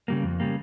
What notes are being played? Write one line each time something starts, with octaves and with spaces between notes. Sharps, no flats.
C#3 G3 A#3
F2
C#3 G3 A#3